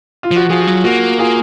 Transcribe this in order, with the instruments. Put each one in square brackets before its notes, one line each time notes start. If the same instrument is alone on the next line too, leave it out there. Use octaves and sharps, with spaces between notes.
[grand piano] F4
[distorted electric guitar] F3 [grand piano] F#4
[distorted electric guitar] F3 [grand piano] F4 G#4
[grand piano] F#4
[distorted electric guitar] F#3 [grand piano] F4
[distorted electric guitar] A#3 [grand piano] F#4
[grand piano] F4 G#4